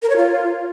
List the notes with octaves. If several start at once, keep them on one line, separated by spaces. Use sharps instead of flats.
A#4
C#5
F4